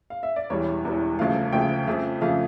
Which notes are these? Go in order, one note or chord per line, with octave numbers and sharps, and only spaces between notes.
F5
E5
D5
E1 E2 E3 G3 C#5
E1 E2 E3 G3
D2 C#3 F3 A3 F5
D2 C#3 F3 A3 G5
F2 C#3 F3 A3
F2 C#3 F3 A3 F5